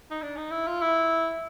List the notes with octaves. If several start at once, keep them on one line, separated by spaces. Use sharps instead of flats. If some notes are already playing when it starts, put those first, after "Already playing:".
D#4
D4
D#4
E4
F4
E4